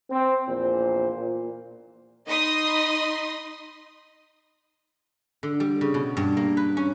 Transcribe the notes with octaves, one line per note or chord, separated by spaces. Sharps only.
C4
A#1 E2 A#2 C5
A#2
D#4 D#5 B5 C6 D#6
D3
G3
C#3
B2
G2
A#3
B4
C#4